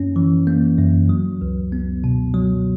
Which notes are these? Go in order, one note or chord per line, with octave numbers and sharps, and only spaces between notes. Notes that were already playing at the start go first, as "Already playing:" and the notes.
Already playing: F#2 A#3 C#4
E3
A#3
F#2
F#3
C#2
B3
B2
F#3